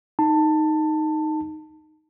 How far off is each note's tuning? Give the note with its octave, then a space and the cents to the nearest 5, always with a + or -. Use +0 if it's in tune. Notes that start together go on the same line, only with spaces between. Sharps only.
D#4 +0 A5 +15